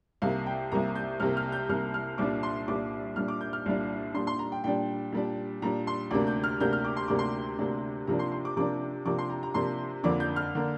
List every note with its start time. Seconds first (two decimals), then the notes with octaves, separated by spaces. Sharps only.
0.22 C2 C3 A#3 F5
0.46 G5
0.72 C2 C3 A#3 A#5
0.95 G6
1.20 C2 C3 A#3 F6
1.37 F6
1.52 G6
1.69 C2 C3 A#3 F6
1.94 F6
2.18 C2 A#2 G3 D4 D6
2.43 C6
2.68 C2 A#2 G3 D4 D6
3.16 C2 A#2 G3 D4 F6
3.28 D6
3.41 G6
3.53 F6
3.66 C2 A#2 G3 D4
4.14 A#2 G3 D4 C6
4.27 C6
4.39 A#5
4.52 G5
4.64 A#2 G3 D4 G5
5.12 A#2 G3 D4
5.62 A#2 G3 D4 A#5
5.87 C6
6.11 D2 C3 A#3 D4 D6
6.27 G6
6.44 F6
6.60 D2 C3 A#3 D4 G6
6.73 F6
6.85 D6
6.97 C6
7.08 D2 C3 A#3 D4 D6
7.19 C6
7.58 D2 C3 A#3 D4
8.07 C3 F3 A#3 D4 A#5
8.19 C6
8.32 C6
8.45 D6
8.57 C3 F3 A#3 D4 D6
9.05 C3 F3 A#3 D4 D6
9.18 C6
9.30 A#5
9.43 A#5
9.54 C3 F3 A#3 D4 C6
10.03 F2 D3 A#3 D4 D6
10.20 G6
10.36 F6
10.55 D3 A#3 D4